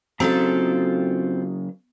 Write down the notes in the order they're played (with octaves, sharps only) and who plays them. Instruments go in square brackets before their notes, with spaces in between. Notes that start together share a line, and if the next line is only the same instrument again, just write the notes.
[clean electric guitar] C#3 F#3 A#5 [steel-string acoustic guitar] C4 F4 A4